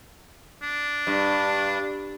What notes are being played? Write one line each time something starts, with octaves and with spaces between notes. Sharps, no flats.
D4
G2